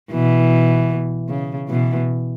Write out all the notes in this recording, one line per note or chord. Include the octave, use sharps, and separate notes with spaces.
B2 E3
C#3
B2 E3